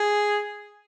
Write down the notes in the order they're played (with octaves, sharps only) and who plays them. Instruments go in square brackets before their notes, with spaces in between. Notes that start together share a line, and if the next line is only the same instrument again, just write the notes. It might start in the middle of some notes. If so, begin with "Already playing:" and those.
Already playing: [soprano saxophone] G#4